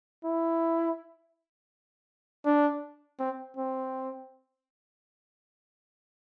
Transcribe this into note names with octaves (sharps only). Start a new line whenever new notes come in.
E4
D4
C4
C4